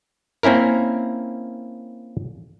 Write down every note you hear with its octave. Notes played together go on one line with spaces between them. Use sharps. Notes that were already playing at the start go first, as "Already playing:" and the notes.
A#3 C4 C#4 E4 A#4